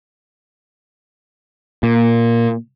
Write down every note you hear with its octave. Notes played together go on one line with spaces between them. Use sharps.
A#2